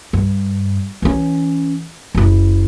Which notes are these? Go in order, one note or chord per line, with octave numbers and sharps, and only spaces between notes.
G2
E3 C#4
F#1 E4